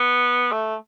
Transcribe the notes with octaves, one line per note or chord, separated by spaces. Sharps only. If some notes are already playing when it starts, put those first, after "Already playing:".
Already playing: B3
A3